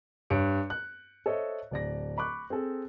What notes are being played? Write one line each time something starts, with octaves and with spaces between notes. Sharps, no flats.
G2 C#5 C#7 D7
F#6
A4 C5 C#5 D#5 E5
D1 D5 A#6
B5 C#6 D6 F#6
C4 G#4 A4